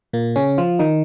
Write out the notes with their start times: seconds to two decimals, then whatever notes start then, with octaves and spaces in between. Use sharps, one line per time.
0.13 A#2 A#3
0.36 C#3 C#4
0.58 F3 F4
0.79 D#3 D#4